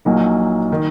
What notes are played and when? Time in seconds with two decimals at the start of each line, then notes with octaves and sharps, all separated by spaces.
0.05 A#1 A#2 F#3 A#3 D#4
0.72 D#3